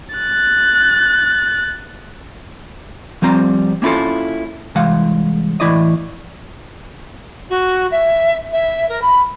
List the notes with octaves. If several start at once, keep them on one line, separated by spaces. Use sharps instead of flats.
F#6 A6
F3 G3 C4 A#5
A#3 C#4 E4 F4 A4
C2 E3 G#3 F5 F#5
A2 E3 E4 D5 D#5
F#4
E5
E5
A#4
B5